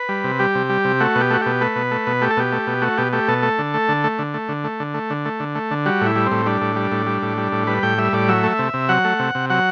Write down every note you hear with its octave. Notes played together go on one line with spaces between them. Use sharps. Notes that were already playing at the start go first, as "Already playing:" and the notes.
Already playing: B4
G3
C3
G3 G4
C3
G3
C3
A3 F#4
B2
G4
A3 F#4
B2 G4
A3 B4
B2
A3
B2
A3 G4
A4
B2 G4
A3
B2
A3 F#4
B2 G4
A3 G4
B2 A4
A3
D3
A3
D3
A3
D3
A3
D3
A3
D3
A3
D3
A3
D3
A3
D3
G3 F#4
A2 E4
G3
C4
A2
G3 D4
A2
G3
A2
G3
A2
G3
A2
G3 B4
A2 G5
G3 E5
A2 D5
F#3 E5
A3
C3
C3
F#3 F#5
A3
C3
C3
F#3 F#5